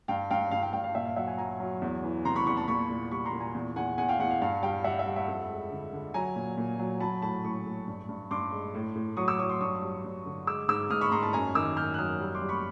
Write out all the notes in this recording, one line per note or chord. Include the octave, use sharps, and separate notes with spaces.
G2 F5 G5
G2 F5 G5
G2 F5 G5
F5 G5
G2 F5 G5
F5
A#2 E5
F5
F#3 E5 F#5
F#5 G#5
F#3 G#5 A#5
F#3
E2
E3
C3 A#5 C6
B5 C#6
E2 B5 C#6
A5 B5
A#2 B5 C#6
A#2
G3 B5 C#6
A#5 C6
A#2
G#5 A#5
E2
E2 F#5 G#5
E2 F#5 G#5
F5 G5
E2 F#5
F5
G2 F5
G3 F5 G5
G3 E5 F#5
E5
G3 F5
E5 F#5
F2
G#3
D3
D3
F#3 G#5 A#5
A#2
A#2
F#3
F#3 A5 B5
A2 A5 B5
A2 B5 C#6
A2
G2
G2
G2 C6 D6
G#3
A2
A2
F#3 C#6 D#6
D6 E6
F#3 C#6 D#6
C6 D6
G2 C#6 D#6
G3
G2
D3
G#3 D6 E6
G#2 D6 E6
G#2 D#6 F6
B5 C#6
G#2 A#5 C6
A5 B5
F#2 G#5 A#5
D#3 D6 E6
F#2 F6 G6
F#6
F#3 D#6 F6
G3
C6 D6
G3
B5 C#6